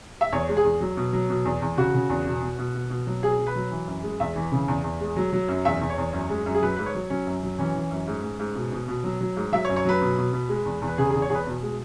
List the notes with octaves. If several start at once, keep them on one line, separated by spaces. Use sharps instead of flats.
E5
E2 C#5
G#3
G#4
E2
F#3
B2
F#3
B2
E2
E2
C#3 F#4
C#3
E2
B2
B2
B2
B2
B2
F#3
B2 G#4
B2
B4
F#3
E3
F#2
G#3
E2 E5
E3
C#3
E2
E2
G#3
F#3
F#3
F#2
E2 E5
E2
C#5
E2
F#2
G#3
F#2
G#4
F#3 B4
G#2 B4
C#5
F#3
F#3 C#4
F#2
F#3
E3 C#4
E3
F#2
G#2
G#2
G#2
B2
B2
B2
F#3
F#3
G#2
F#3 E5
C#5
F#2
C#5
F#3 B4
B2
B2
B2
G#3
E2
E2
B4
C#3 G#4
E2 G#4
C#5
E2 G#4 B4
B2
G#3